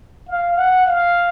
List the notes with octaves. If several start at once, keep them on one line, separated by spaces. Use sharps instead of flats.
F5
F#5
F5